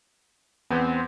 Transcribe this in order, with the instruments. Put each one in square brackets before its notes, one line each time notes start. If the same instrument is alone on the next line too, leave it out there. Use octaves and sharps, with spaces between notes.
[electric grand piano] E2 B3 [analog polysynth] C4